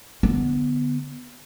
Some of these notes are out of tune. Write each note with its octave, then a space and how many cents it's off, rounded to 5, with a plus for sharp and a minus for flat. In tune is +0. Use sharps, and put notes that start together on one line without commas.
D3 +0 B3 +0